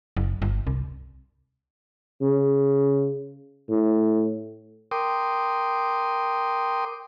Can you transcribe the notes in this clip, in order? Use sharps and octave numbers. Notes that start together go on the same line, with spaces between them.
F#1
G1
C2
C#3
A2
A#4 G5 C6 D6 D#6